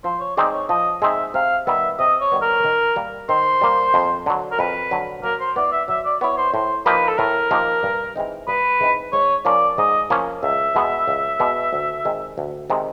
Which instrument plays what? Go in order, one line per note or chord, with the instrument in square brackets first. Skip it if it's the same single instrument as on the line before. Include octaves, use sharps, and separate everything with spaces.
[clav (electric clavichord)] F3 [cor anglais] C5
[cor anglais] C#5
[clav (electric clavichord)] G#3 C4 D#4 [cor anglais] D5
[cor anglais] C#5
[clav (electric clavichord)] F3 [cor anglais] D#5
[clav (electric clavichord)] G#3 C4 D#4 [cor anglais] E5
[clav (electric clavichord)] C3 [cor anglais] F5
[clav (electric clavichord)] D#3 G3 B3 [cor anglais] E5
[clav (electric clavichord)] C3 [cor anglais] D#5
[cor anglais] C#5
[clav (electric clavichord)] D#3 G3 B3
[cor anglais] A#4
[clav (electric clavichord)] D#3
G3 A#3
[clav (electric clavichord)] D#3 [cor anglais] C5
[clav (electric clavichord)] G3 A#3
F2
D3 F#3
[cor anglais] A#4
[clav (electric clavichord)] F2 [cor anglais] B4
[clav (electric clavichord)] D3 F#3
[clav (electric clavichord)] F#3 [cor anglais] A#4
[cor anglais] C5
[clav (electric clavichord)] B3 E4 [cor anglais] D5
[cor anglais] E5
[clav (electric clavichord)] F#3 [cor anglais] E5
[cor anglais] D5
[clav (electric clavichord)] B3 E4 [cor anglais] C#5
[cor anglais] C5
[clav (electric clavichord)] A2 [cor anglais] C5
[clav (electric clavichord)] F3 A#3 D#4 G4 [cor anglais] B4
[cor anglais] A4
[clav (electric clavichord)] A2 [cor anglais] A#4
[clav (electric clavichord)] F3 A#3 D#4 G4
G2
E3 G#3 C4 D#4
[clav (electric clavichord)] G2 [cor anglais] B4
[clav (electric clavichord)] E3 G#3 C4 D#4
[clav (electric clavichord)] G#2 [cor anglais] C#5
[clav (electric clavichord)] F3 A#3 C#4 [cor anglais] D5
[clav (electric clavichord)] G#2 [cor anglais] D#5
[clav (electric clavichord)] F3 A#3 C#4
[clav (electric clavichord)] C#2 [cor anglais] E5
[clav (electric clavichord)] B2 G#3 B3
C#2
B2 G#3 B3
D2
C3 D#3 G#3
D2
C3 D#3 G#3